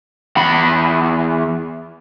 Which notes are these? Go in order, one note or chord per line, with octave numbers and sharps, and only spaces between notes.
E2 B5